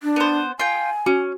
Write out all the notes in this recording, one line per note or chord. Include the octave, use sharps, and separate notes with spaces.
D4
B3 C5
F4 G5 G#5
C#4 F#4